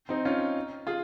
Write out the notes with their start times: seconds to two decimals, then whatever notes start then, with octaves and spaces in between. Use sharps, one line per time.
0.09 C4 D#4
0.25 C#4 F4
0.87 F4 G#4